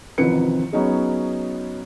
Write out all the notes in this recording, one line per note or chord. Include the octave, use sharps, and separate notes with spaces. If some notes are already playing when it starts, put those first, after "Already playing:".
A1 C3 D#3 F3 B4 C#7
F#3 B3 C#4 D#4 G#4